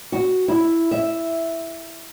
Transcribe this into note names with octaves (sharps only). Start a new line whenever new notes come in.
F#4
E4
E5